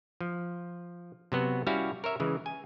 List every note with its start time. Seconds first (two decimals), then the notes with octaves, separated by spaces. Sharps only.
0.21 F3
1.32 C3 F#3 B3 F#4
1.67 G3 C#4 E4 F#4 C#5 F5
2.04 A#4 C#5 E5
2.20 C#3 E3 G#3
2.46 G#5